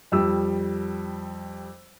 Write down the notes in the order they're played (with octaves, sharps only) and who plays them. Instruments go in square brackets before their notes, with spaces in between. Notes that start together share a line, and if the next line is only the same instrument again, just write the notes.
[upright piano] F2 G3 E6